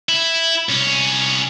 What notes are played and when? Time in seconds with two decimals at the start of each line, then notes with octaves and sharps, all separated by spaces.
0.09 E4
0.69 C2 C#4